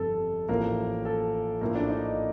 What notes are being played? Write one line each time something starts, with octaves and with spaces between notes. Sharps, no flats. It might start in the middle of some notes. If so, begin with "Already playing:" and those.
Already playing: G1 F2 C3 A4
A1 A2 F3 A#3 A#4
A4
A#1 A2 F3 A#3 A#4
D4 D5
D#4 D#5